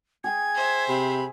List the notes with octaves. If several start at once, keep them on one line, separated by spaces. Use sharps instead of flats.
G#4 G5 G#5 G#6
C5 E5
C3 B5